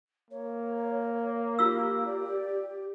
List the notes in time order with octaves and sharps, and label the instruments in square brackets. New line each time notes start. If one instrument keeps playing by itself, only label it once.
[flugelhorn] A#3 [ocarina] C#5
[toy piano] F4 E6 [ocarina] G4
[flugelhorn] D5